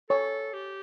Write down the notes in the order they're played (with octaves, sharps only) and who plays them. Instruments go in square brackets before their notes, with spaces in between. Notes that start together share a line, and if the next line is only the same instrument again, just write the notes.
[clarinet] A4 [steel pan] C#5
[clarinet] G4